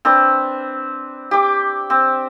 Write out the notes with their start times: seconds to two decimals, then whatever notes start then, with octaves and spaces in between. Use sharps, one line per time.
0.05 C4 D4 B4
1.31 G4 D6
1.90 C4